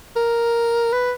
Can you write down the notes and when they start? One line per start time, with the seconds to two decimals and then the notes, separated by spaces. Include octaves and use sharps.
0.16 A#4
0.93 B4